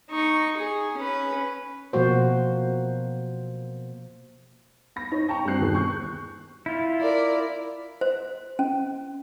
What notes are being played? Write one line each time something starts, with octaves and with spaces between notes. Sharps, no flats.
D#4 C#6
G#4
C#4 B4
B2 F3 A#3 F#4 C5
B5 A#6
D#4 C#5
G5 A5 A#5 C#6
G2 G3 C4 F#4 F#6 C7
G1 D#2 B2 G#4
C#6 F#6 G6
E4 F4
A#4 D5
C5
C#4